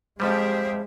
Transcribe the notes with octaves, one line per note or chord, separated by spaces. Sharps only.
F2 F3 G3 G#3 G4 G#4 C5 E5